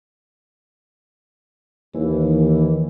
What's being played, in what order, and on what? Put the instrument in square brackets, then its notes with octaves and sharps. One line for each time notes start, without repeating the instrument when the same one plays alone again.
[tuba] D#2 [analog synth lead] E3